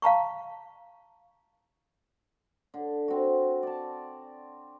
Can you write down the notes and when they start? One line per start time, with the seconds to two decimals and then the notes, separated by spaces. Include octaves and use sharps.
0.02 F5 A5 A#5 C#6
2.74 D3
3.08 C4 F#4
3.63 D5 A5